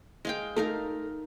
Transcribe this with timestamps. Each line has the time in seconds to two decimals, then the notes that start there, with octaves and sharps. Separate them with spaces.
0.25 G#3 F5 G5
0.56 A3 D#4 A#4 F5